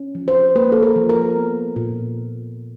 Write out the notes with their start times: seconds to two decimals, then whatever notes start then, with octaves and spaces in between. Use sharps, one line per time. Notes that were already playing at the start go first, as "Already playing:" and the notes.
Already playing: C#4
0.15 F3
0.28 C5
0.55 A#3 B4
0.72 A4
0.83 A#4
0.96 F3
1.09 A#4
1.36 B3
1.76 A#2